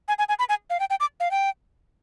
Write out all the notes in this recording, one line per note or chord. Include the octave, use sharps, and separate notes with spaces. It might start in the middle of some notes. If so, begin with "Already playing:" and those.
G#5
G#5
G#5
B5
G#5
F5
G5
G5
D6
F5
G5